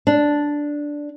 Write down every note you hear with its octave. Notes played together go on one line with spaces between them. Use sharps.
D4